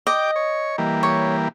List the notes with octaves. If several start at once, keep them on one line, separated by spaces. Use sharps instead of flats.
D#5 G5 D6
C#5
E3 G3 A#3
C#5